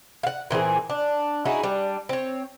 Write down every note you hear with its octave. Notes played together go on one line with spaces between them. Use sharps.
F5 F#5
A#2 E3 C4 G#4
D4
D#4 E4 F#4 G#4
G3 D4
C4 C#5